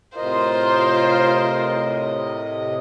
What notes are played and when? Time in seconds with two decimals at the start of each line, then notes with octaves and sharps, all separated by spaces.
0.17 A2 C3 F4 A#4 C5 D#5